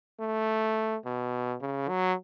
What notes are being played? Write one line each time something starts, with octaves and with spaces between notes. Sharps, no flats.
A3
B2
C#3
F#3